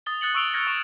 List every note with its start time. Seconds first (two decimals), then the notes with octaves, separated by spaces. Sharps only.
0.06 D#6 A6 G7
0.21 D#6 F#6 A6 C#7 F#7
0.34 C#6 E6 D7 F7 G7
0.54 F6 F#6 G#6 A#6 C#7
0.67 C#6 E6 E7